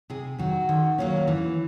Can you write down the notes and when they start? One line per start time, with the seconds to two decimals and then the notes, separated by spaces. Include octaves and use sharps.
0.10 C3 G#4
0.38 D#3 F#3 F#4
0.69 D#3
0.98 F#3 A#3 C#4
1.28 E3